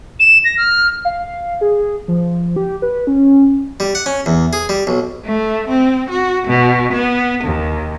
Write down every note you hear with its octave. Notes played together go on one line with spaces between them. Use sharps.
E7
A#6
F6
F5
G#4
F3
G4
B4
C#4
G3
F#5
C#4
E2
G#4
G3
B1
A3
C4
F#4
B2
B3
D#2